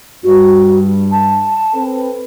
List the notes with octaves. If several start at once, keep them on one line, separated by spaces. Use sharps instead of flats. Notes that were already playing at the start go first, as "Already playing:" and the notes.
G2 F#4
A5
C4 A4 B4